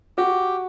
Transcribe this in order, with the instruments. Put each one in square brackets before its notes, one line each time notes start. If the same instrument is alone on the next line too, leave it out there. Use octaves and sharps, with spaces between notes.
[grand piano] F#4 [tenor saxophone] G4